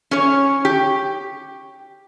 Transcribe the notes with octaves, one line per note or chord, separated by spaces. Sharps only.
C#4 C#5
G4